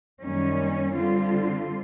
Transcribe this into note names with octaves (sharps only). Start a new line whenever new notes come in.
F#2 D#3 G3 A#3 C#4
D3 G3 C4 F4